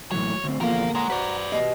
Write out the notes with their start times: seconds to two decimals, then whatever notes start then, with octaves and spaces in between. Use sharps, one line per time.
0.12 A2 E3 F#3 C#5
0.44 D2 C4
0.61 E2 A#2 D3 F3 A#3 A#4 F5
0.95 G#3 F#5 A#5
1.10 F#4 B4 C5 D5
1.52 B2 G4 D#5 G#5